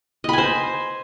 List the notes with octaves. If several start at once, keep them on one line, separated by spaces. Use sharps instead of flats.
C5 D#5 G#5 B5